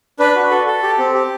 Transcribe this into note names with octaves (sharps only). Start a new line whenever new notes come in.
D4 B4
F#4
A4
A4
G4
C4
G4